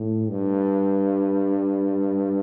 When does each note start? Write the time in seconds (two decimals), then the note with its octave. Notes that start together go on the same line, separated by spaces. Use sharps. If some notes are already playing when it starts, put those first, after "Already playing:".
Already playing: A2
0.30 G2